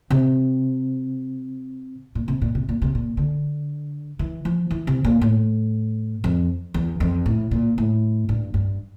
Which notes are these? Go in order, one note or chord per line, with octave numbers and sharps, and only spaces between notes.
C3
A#2
C3
A#2
C3
A#2
C3
A#2
D3
E3
F3
E3
C3
A#2
A2
F2
E2
F2
A2
A#2
A2
G2
G2